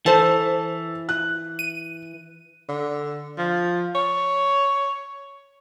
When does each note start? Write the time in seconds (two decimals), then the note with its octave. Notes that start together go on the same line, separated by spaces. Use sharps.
0.06 E3 A4 C5 A5
1.09 F#6
1.59 D#7
2.69 D3
3.38 F3
3.95 C#5